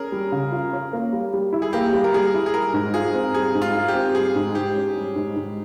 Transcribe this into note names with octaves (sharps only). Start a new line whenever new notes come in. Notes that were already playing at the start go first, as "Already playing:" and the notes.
Already playing: C#4 G#4 A#4
G3
C#3
F4
C#4
A#3
G3
G3
E4
G#4
A#3 G4
G3
A#4
G3 G#4
E4
G#4
G3 A#4
G#2
F4 G#4
C4
G3 G#4
G#2
F4
F4
G4
C4
G3 G#4
G#2
G#2 G4
C#4
G3
G#2
G#2